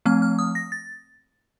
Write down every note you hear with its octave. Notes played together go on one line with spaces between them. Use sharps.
F3 A3 C4 F6
F6
D#6
A#6
A6